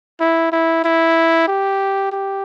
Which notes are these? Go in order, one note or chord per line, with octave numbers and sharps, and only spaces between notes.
E4
E4
E4
G4
G4